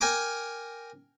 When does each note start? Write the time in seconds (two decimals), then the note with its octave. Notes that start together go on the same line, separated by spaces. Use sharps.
0.01 A#4 G5 G#5 A#5 D6